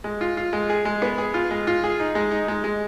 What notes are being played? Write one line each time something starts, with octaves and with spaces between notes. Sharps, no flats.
G#3
F4
F4
G#3
G#4
G#3
B3
G#4
F4
G#3
F4
G#4
D#4
G#3
D#4
G#3
G#3